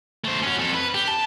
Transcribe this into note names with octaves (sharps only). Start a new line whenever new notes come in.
A3 C5
C#4 F#4
F2 A4
B4
G4
A5